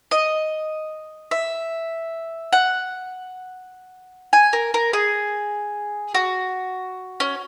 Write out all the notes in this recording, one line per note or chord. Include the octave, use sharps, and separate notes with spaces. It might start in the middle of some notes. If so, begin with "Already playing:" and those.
D#5
E5
F#5
G#5
A#4
A#4
G#4
F#4
C#4